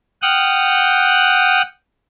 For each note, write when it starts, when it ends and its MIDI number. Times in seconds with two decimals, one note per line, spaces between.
0.22 1.62 78
0.22 1.62 79
0.22 1.62 87
0.22 1.62 89
0.22 1.62 90